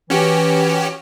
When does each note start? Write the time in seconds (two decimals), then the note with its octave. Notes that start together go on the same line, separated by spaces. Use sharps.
0.10 E3 C#4 F#4 G4